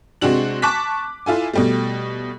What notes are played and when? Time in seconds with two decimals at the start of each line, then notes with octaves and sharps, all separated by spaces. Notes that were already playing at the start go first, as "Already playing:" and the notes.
0.21 C3 G#3 C4 D4 F#4 F#7
0.62 A5 C#6 D6 F#6 B6
1.26 E4 F4 A4 G#5
1.53 B2 G3 A3